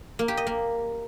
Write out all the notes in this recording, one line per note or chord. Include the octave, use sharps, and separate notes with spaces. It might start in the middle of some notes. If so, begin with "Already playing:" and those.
A#3
G4
D#5
A#3